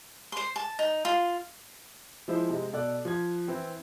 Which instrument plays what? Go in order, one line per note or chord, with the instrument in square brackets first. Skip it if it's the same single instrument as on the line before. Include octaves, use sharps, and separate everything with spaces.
[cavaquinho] C5 C6
A5
D#4
F4 C6
[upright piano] F3 G#3 E4 C5
C3 G#3 C4
B2 A4 D5 F#6
F3 G#6
E3 C4 E4